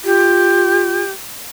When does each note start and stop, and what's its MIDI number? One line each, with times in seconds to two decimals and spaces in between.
0.04 1.03 65
0.04 1.11 67